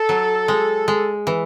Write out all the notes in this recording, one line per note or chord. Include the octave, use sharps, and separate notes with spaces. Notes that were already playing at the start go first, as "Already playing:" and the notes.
Already playing: A4
F#3
G#3
G#3
E3